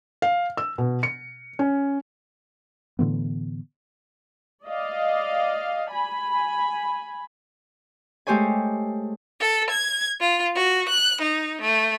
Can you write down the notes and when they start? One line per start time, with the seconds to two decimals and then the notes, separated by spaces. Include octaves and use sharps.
0.22 F5
0.57 E6
0.78 B2
1.03 C#7
1.59 C#4
2.99 A2 D3 E3 B3
4.64 D5 D#5 F5
5.90 G#5 B5
8.27 G#3 A3 G4 C5 C#5 G#5
9.40 A4
9.71 G#6
10.19 F4
10.55 F#4
10.89 F#6
11.20 D#4
11.62 A3